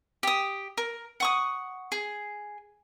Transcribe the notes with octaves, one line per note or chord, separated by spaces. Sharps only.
G4 D#6
A#4
F#5 C#6 D#6
G#4